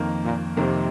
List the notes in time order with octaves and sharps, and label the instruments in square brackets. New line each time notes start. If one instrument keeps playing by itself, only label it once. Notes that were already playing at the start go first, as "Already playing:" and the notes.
Already playing: [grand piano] F2 D#3 A#3
[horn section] A#2
[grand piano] F2 D#3 A#3 [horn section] C3